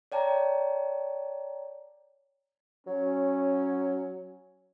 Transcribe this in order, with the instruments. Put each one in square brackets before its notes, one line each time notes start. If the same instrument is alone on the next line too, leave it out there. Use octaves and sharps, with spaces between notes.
[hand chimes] C#5 D5 G5 A5 A#5
[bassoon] F#3 [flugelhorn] C#4